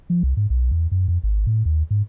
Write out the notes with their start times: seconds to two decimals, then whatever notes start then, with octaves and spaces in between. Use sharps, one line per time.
0.10 F3
0.23 C2
0.37 G#2
0.50 B1
0.71 E2
0.92 F#2
1.08 F2
1.23 G#1
1.47 A2
1.65 D#2
1.91 G#2